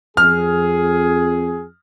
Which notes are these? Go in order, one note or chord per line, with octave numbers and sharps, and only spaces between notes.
F2 G#4 F6